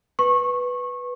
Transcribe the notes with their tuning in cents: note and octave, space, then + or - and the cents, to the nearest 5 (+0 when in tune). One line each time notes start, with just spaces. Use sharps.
B4 +0 C#6 -25